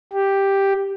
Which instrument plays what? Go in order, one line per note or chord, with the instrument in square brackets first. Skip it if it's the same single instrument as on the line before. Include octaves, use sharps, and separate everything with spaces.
[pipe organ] G4